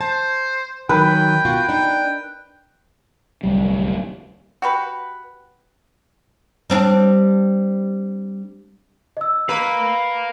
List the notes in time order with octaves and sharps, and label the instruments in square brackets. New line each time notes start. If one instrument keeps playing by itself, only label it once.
[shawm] C5 [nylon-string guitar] A5
[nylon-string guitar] D#3 F#3 [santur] B4 [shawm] G5
[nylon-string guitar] B2 F4 F#4
[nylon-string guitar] D4 D#4 [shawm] G5
[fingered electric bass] D1 C2 G3
[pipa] F#4 G4 B4
[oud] G3 C4 D4
[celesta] D#5 E6
[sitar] B4 [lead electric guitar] F5 A#5